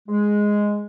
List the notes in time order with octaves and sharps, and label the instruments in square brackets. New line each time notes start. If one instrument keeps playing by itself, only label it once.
[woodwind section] G#3